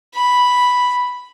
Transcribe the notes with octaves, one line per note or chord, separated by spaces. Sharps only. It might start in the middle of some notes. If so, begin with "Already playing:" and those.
B5